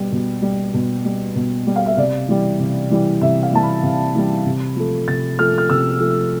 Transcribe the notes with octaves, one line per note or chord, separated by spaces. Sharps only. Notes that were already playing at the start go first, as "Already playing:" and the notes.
Already playing: B2 G3
B2
G3
B2
G3
B2
G3
F5
E5
C3 D5
E3 G3
C3
E3 G3
C3 E5
F5
E3 G3 A5
B5
C3
E3 G3
C3
F3 A3
C3 A6
F3 A3 F6
F6
C3 E6
F3 A3